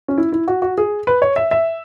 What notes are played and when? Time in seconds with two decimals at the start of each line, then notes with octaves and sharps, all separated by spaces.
0.08 C#4
0.18 E4
0.32 E4
0.48 F#4
0.62 F#4
0.78 G#4
1.07 B4
1.22 C#5
1.36 E5
1.51 E5